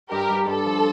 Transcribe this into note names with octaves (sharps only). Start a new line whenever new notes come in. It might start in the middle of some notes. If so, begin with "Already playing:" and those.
G2 G4 A#4
G2
G2 A4
F3